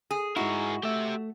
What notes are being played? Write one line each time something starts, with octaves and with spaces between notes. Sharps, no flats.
G#4
G#2 D#4 E4 F#4 G#4 A#4
A3 G4 E5